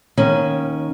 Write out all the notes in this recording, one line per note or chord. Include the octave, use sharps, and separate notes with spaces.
D#2 D#3 C#4